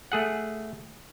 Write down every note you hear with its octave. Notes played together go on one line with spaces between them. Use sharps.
A3 G#4 F#5